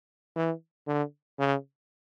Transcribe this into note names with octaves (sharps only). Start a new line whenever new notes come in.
E3
D3
C#3